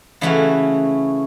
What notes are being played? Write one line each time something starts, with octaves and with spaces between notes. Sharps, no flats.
C#3 E3 A3 C#4 F#4